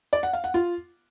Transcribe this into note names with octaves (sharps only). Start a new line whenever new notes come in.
D5
F#5
F5
F#5
F4